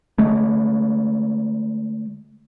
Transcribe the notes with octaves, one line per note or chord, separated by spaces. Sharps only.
D3 G#3 A3